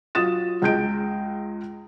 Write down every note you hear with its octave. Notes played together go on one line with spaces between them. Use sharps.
F#3 F4 D#6 A6 E7
C#2 G#3 G6 D7